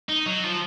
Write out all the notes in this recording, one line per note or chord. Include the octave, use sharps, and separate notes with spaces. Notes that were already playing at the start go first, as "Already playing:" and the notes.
D#4
F#3
F3